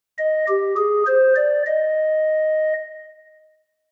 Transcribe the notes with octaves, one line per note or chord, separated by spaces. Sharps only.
D#5
G4
G#4
C5
D5
D#5